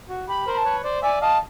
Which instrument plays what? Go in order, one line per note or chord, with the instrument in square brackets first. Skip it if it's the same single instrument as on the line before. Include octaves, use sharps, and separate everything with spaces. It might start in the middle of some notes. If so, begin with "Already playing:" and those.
[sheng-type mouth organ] F#4
[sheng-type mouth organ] G4 [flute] B5
[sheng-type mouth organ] A#4 C5
[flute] B5
A5
[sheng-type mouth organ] B4 C#5
C5 D5
[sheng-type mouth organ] D5 E5 [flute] G#5
[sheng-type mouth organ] D#5 F5 [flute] A5